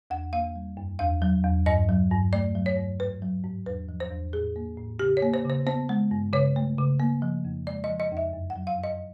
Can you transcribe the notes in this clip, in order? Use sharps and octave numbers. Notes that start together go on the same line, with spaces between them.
E2 F#5
A#3 F5
G3
F#2
E2 F5
F#3
E2
G2 D#5
F#3
G2
A3 D5
F#3
C#5
G2
G#2 B4
F#3
G#2
E2 B4
F3
C5
E2
A2 G#4
A#3
A2
C#3 G4
C#5
A#3
C5
C#3
C5
B3 C5
G#3
G2
C#3 C#5
A3
C#3
A#3
F3
F2
G#3 D5
D#5
F3
D#5
F2
E5
F#2
F#5
F#3
F5
F#2 D#5